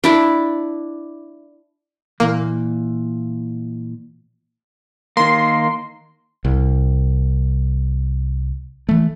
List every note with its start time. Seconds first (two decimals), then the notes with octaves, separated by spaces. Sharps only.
0.04 D4 E4 D5
2.20 A#2 E3 A#3
5.17 D#3 A#3 C6
6.45 C2
8.89 E3 A3